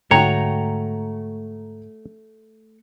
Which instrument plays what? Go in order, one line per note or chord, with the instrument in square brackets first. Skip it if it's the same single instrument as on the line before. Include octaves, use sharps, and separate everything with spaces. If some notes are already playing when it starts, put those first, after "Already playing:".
[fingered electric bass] G#2 D3 [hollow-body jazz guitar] A3 F#4 [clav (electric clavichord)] C#5 [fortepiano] G5 A#5